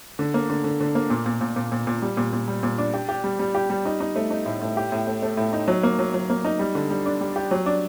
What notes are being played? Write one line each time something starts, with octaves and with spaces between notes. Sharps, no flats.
D3
A#3
D3
D3
D3
A#3
A#2
A#2
A#2
A#2
A#2
A#2
G3
A#2
A#2
G3
A#2
D4
G4
G4
G3
G3
G4
G3
D#4
D#4
A3
D#4
A2
A2
G4
A2
A3
A3
A2
D#4
F#3
A#3
F#3
F#3
A#3
D#4
G3
D3
G3
D4
G3
G4
F#3
D4